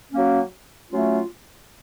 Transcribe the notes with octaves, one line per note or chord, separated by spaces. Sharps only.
F#3 A#3 C#4
F#3 A3 C#4 F4